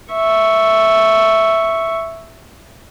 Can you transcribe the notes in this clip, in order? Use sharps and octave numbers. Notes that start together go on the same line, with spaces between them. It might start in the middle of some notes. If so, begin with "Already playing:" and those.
E5 C#6